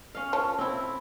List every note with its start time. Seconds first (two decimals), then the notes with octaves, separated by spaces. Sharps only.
0.15 C#4 F5
0.33 F3 A4 C#5
0.59 C4 E4